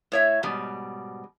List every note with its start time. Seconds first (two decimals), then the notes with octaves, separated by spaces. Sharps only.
0.12 A2 C#5 E5
0.43 G#2 B2 G3